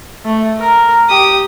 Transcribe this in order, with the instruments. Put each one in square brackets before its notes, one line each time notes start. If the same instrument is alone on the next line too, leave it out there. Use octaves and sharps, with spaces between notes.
[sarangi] A3
A#4
[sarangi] G4 [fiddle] D#6